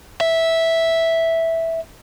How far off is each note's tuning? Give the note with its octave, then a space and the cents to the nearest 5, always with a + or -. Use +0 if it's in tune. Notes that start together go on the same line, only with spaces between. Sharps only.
E5 -5